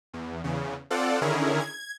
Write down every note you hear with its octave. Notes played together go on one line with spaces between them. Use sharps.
E2
E2 C#3
C4 F4 A4 D5 F#5
D3 D#3 C#4 E4 G#4 A#4
G#6